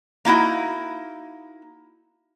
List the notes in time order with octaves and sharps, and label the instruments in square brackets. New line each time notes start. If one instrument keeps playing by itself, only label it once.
[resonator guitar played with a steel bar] A#3 D#4 E4 F#4